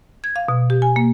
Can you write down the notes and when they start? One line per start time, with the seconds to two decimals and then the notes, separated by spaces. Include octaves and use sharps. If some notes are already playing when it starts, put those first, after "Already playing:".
0.24 G#6
0.36 F5
0.48 B2
0.70 G4
0.82 G#5
0.96 A#3